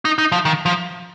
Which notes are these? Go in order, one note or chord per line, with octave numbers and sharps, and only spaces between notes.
D#4
D#4
F3
D#3
F3